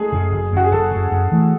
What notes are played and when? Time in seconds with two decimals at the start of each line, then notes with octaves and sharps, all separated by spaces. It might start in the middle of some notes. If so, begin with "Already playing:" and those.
Already playing: G#3 A3 G#4
0.12 F#2 C#3
0.32 F#1
0.52 F#2 C#3 F#4
0.64 G#4
0.71 F#1 A4
0.91 F#2 C#3
1.11 F#2
1.32 E3 A3